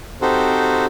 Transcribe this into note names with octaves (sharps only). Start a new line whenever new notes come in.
C4 D#4 F#4 G4 A4 C5